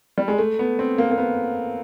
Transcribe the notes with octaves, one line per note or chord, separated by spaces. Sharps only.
G3
G#3
A3
B3
C4
A#3
A#3
B3